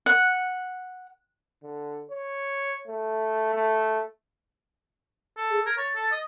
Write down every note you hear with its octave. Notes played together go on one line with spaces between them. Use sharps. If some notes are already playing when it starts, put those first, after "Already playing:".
F#5
D3
C#5
A3
A3
A4
G#4
A#4 G#6
C#5 A6
A4
D#5